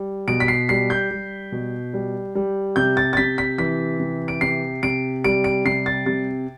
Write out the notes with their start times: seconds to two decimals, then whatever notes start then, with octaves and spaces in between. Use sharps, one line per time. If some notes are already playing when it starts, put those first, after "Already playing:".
Already playing: G3
0.28 B2 D7
0.40 B6
0.48 C7
0.69 G3 C7
0.90 G6
1.11 G3
1.52 B2
1.94 G3
2.35 G3
2.76 C3 G6
2.97 A6
3.13 A6
3.17 C3 B6
3.38 B6
3.58 E3 B6
3.99 C3
4.28 D7
4.41 C3 C7
4.83 C3 D7
5.24 G3 D7
5.44 D7
5.65 C3 C7
5.86 A6
6.06 C3 A6